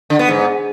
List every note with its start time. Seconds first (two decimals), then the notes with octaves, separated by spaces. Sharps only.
0.10 D3
0.19 B3
0.28 G#2